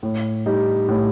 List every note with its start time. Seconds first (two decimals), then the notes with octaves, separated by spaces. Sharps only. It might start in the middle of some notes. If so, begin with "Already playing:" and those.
0.03 A2
0.46 G3 D#4 G4
0.89 A2